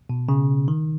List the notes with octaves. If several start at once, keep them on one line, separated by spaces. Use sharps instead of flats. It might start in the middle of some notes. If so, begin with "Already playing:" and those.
B2
C#3
D#3